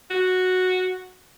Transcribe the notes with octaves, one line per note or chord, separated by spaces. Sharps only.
F#4